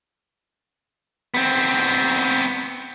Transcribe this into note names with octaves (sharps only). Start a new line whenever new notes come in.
B3 C4